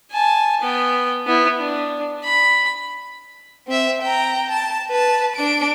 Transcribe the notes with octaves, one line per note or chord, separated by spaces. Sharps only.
G#5 A5
B3 G5
B3 E4
D4
B5
C4 E5
G5 A#5
A5
B4 A5
D4 D7